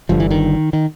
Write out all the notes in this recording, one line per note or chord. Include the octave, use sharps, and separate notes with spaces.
G1 G2 D3 F3
E3
D#3
D#3